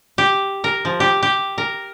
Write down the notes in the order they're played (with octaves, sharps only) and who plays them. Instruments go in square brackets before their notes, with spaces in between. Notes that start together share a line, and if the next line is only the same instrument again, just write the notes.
[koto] G4
A#4
F3
G4
G4
A#4